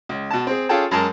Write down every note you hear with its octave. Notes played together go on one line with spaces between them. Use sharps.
C#2
B2 A5
C4 G#4
C#4 F4 G#4 A4 G5 A5
F#2 G#3 G#4 A#4 A5